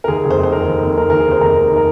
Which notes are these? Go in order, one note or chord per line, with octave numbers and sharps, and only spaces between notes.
A#4
D#2 G#4
F1
C5
F1
C5
D#3 A#4
D#2
F1
F1 A#4
D#3 A#4
G#4
D#2
C5
F1 A#4
F1
D#3 A#4